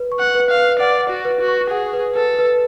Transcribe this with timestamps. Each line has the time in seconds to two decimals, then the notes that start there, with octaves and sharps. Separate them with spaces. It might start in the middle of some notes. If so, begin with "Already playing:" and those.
Already playing: B4
0.12 C#6
0.19 F#5
0.35 B4
0.50 F5
0.58 B4
0.79 D5 F#5
1.03 F#5
1.10 F#4
1.25 B4
1.40 F#4
1.48 C#6
1.70 G#4 F#5
1.93 B4
2.15 A4 B4
2.39 B4